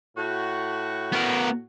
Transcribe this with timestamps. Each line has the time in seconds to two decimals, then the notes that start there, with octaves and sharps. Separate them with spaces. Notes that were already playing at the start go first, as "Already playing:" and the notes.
0.17 A2 F#4
1.12 B3 A#4